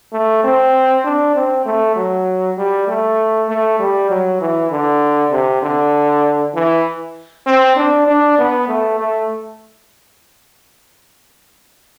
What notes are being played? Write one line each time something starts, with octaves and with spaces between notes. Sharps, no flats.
A3
C4
D4
C4
A3
F#3
G3
A3
A3
G3
F#3
E3
D3
C3
D3
E3
C4
D4
D4
B3
A3
A3